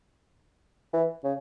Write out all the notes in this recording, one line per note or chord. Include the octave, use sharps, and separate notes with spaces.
E3
C#3